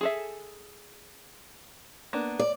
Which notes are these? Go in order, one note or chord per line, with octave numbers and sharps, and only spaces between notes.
G#4 A4 E5
A#3 B3 D4
D5